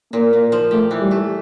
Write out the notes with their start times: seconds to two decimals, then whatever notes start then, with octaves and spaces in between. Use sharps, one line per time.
0.13 A#2 A#3
0.33 A#2
0.52 F3
0.71 A3 G4
0.91 E3
1.00 G3
1.11 A3